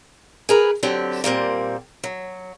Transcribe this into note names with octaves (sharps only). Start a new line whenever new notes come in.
G#4 A#4 B4
D3 F#3 C4 G4
A#2 G3 A#3 C4
F#3